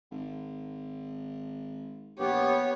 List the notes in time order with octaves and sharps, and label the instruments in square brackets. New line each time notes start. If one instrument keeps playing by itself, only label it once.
[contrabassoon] G#1
[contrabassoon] A#1 [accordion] B3 [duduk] G4 [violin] C#5